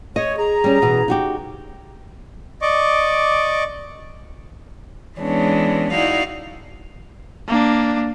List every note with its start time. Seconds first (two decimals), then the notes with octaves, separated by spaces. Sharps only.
0.16 G#4 C#5 D#5
0.37 G#4 A#5
0.64 G3 C#4
0.82 B2 E3
1.08 D#4 F#4 G4
2.62 D5 D#5 C#6 D6
5.19 E3 G#3 B3 C#4 D4
5.93 D#4 E4 F#4 D5 F5
7.48 A#3 D4